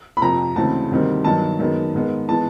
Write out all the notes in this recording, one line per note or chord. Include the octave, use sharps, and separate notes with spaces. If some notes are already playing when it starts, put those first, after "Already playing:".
B5
F2 C3 F3 A#5
D2 C#3 E3 G#3 C4 A5
D2 C3 D#3 G3 C4
G2 D#3 F#3 B3 A5
F#2 D#3 G#3 B3
G#2 D#3 G#3 B3
E3 G#3 B3 A5